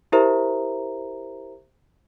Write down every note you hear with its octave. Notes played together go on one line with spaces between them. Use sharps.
E4 G4 A#4 C5 E5 A#5